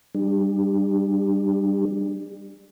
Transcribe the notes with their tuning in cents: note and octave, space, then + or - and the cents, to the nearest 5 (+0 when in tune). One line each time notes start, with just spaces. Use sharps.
G3 +0 D4 +25 G4 +40